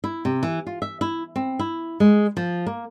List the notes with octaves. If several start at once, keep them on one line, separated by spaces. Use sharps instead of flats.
E4
C3
E3
F4
E5
E4
C4
E4
G#3
F3
A#3